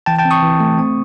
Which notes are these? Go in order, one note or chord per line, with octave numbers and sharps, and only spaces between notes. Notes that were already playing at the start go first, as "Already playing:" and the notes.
E3 G5 A5
G5 A5
C4
C#6 D#6
E3
A3
C4